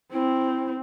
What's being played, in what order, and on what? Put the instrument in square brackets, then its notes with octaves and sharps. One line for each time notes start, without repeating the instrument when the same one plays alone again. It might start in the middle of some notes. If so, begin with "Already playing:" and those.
[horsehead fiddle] C4 [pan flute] E4